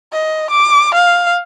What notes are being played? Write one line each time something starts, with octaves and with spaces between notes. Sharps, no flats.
D#5
D6
F5